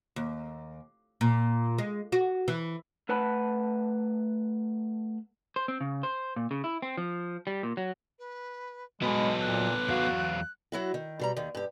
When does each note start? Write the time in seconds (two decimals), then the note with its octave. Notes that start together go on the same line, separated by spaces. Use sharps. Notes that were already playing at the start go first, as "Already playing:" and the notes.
0.16 D#2
1.21 A#2
1.78 G#3
2.12 F#4
2.48 E3
3.09 A3 B4 F#5 A5 B5
5.56 C5
5.68 C4
5.81 C#3
6.03 C5
6.36 A#2
6.51 C#3
6.64 E4
6.82 C4
6.97 F3
7.47 G3
7.63 A#2
7.77 F#3
8.19 B4
9.02 F#3 G#3 B3 F#4 A4 D#5 B5
9.41 A#2 F#6
9.88 E2 F#3 F#4 F5
10.72 F#3 E4 F#4
10.94 D#3
11.19 B2 G3 A#5
11.36 D#2 D#3
11.55 G2 G4